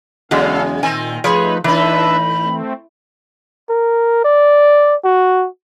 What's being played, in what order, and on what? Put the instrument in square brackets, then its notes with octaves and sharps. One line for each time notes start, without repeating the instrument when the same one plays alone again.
[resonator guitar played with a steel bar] E2 F#3 G#3 [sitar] C#3 [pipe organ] C#4 A4 F5
[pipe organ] A#2 [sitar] D#3 C4 [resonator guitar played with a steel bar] G#5
[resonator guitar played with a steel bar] F3 [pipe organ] A3 D#4 B4 [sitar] G#4 C#5 [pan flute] B5
[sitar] A2 D#4 [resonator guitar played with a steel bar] E3 [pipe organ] D4 B4 E5 [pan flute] B5
[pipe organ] A3 C4
[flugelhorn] A#4
D5
F#4